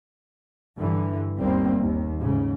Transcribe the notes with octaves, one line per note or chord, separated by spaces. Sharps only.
G2 D3 E3
G1 D#2 G3 A#3 C4
D#2
G#2 C#3